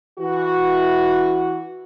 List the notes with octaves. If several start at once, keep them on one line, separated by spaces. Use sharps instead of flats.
E3 F#4